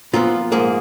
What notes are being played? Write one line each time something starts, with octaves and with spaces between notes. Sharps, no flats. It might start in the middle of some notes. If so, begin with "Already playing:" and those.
A#2 F3 B3 F4
G#2 F3 A#3 G#4